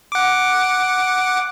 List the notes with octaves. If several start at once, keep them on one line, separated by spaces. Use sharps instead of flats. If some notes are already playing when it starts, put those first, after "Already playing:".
F#5 D6